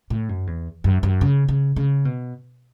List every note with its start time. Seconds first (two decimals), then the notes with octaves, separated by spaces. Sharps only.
0.10 A2
0.29 F#2
0.47 E2
0.84 F#2
1.03 F#2
1.21 C#3
1.48 C#3
1.76 C#3
2.05 B2